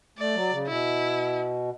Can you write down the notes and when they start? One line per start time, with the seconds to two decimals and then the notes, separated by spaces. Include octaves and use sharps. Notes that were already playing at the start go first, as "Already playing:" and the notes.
0.18 A3 D5
0.34 F#3
0.51 C#3
0.67 B2 E4